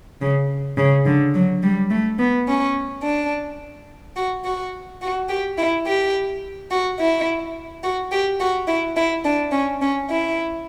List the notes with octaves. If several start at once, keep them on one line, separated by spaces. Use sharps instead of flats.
C#3
C#3
D3
F#3
G3
A3
B3
C#4
D4
F#4
F#4
F#4
G4
E4
G4
F#4
E4
F#4
G4
F#4
E4
E4
D4
C#4
C#4
E4